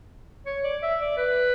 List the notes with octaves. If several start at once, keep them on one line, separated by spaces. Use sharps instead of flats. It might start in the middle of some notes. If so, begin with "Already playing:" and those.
C#5
D5
E5
D5
B4